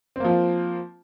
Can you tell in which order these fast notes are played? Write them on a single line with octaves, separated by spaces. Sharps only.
C4 A#3 F3 F4